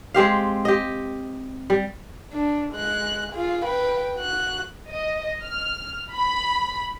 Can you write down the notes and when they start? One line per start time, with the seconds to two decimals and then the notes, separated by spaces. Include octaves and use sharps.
0.14 G#3 C4 G4 F5
0.65 G4 D#5
1.70 G3
2.33 D4
2.72 G#3 F#6
3.32 F4 G#4
3.65 B4 G5
4.16 F#4 F#6
4.90 D#5
5.44 F6
6.12 B5